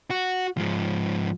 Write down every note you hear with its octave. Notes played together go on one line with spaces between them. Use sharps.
F#4
G#2 F3